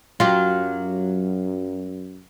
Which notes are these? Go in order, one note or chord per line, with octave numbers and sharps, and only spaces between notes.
F#2 F#3 F4 G4